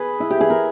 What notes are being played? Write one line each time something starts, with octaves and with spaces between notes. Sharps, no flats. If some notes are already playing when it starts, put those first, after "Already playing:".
Already playing: G#4 B4
E4
G4
G#4
A#4